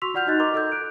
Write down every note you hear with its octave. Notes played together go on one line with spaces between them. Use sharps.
F#4 C6 C#6 E6 B6 F7
F4 D5 F#5 F6 G6 F7
D#4 F#4 D#5 F#6 A6
A#4 D#5 A#5 C6 D6
A4 D#5 E6 G6
F#6 D7